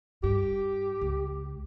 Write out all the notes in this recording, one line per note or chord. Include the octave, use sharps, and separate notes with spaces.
G2 G4
C#2